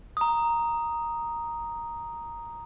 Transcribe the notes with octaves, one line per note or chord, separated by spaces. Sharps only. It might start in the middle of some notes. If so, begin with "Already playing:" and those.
A#5 D#6